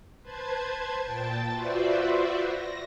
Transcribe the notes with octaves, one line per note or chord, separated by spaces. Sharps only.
B4 C5 A5 G#6
A#2 G5 A5 A6
F4 F#4 B4 C5 D5 E5
A#6